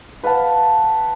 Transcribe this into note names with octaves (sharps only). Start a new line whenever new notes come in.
B4 F5 F#5 A5